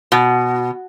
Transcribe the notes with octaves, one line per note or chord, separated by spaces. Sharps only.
B2